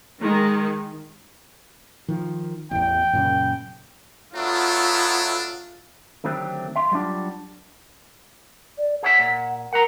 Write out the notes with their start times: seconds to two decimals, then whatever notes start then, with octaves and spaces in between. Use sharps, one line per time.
0.21 D#3 G#3
2.08 D#3 F3
2.71 A1 E2 G5
3.13 F#2 A#2 C#3
4.35 F#3 A3 B3 D4 F4
6.24 D3 D#3 F#3 A3 C4 G4
6.76 E5 F5 C6
6.92 F#3 G3 C4 D4 F4
8.78 D5
9.03 G#4 C#5 E5 F#5
9.19 A#2
9.73 A#4 F#5 A#5